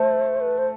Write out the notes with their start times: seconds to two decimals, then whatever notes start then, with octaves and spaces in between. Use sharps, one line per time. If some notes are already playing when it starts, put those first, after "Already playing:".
Already playing: A3 C5
0.41 B4
0.58 C5